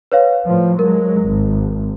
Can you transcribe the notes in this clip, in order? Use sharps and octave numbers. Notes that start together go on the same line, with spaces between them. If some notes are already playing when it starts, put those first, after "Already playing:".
B4 C#5 F5
A2 F3
F#3 G#3 A#4
G#1